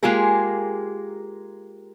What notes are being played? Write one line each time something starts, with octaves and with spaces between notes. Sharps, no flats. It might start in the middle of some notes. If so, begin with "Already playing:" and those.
G#3 A#3 F4 G4 G#4 A#4